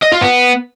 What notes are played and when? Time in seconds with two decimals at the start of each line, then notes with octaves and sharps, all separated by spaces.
0.03 D#5
0.12 F4
0.22 B3